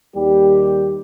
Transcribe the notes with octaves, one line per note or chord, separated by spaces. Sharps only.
D#2 G3 G4